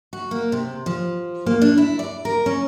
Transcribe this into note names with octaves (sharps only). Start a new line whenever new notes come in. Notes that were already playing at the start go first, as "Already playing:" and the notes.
F#4
A#3
C3
F3
A#3
D4
E4
D5
A#4
C#4